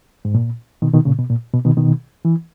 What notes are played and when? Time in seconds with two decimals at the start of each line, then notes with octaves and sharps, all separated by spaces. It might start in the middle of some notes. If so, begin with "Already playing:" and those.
0.25 G#2
0.35 A#2
0.82 B2 D#3
0.93 B2 D#3
1.05 A#2 C#3
1.18 B2
1.30 A#2
1.53 B2
1.65 B2 D#3
1.77 B2 D#3
2.25 E3